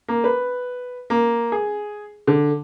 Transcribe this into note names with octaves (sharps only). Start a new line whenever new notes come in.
A#3
B4
A#3
G#4
D3